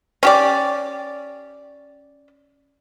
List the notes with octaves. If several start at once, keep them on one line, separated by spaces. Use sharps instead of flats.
C#4 G4 D5